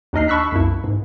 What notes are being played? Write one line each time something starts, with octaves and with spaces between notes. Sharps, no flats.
D#2 D4 D#4 D#5 F6 C7
A5 B5 C#6 E6 F#6 B6
C2 F#2 E4
G#2